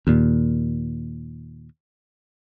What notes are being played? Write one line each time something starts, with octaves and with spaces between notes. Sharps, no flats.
D#2 A#2